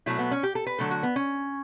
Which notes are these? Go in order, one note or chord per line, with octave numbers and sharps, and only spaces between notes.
B2 F#3 A3 E4
B3
C#4
G4
A4
B4
D3 F#3 A3 A4
F#4
B3
C#4